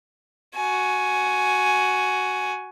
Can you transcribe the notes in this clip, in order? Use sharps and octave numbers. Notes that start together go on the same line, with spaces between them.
F#4 G#5